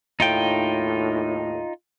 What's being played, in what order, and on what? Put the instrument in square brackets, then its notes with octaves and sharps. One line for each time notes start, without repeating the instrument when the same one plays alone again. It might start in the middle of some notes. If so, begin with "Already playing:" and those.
[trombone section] D#2 A2 [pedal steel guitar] D#4 F4 G5